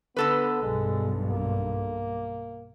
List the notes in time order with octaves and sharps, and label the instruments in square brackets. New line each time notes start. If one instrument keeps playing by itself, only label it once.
[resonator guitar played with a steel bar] D3 A4 B4 [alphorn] B3
[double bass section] B1 G2 [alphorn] G#3
[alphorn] A#3